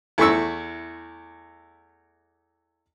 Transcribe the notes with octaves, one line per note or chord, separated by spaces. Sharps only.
E2 A3 E4 C#6 E6